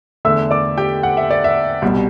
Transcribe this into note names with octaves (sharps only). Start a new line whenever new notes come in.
E2 D3 A3 E5 E6
D5 D6
G4 G5
F#5
E5
D5
E5
C2 B2 G3